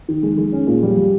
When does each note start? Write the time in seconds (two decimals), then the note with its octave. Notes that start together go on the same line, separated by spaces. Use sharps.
0.08 D#3
0.23 G#3
0.38 G#3
0.52 C#4
0.67 A#2
0.83 G3
0.97 G3